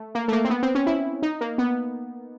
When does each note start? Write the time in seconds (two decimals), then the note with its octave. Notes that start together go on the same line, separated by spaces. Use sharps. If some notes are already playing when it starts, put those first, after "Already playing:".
Already playing: A3
0.15 A#3
0.28 A3
0.32 A#3
0.44 C4
0.50 B3
0.63 C4
0.75 C#4
0.86 E4
1.22 D#4
1.41 A#3
1.58 B3